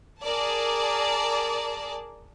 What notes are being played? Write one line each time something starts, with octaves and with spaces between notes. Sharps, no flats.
G#4 A#4 D5 A5